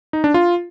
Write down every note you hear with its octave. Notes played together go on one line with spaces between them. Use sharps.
D#4
D4
F4